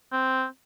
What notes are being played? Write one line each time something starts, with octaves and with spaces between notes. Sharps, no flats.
C4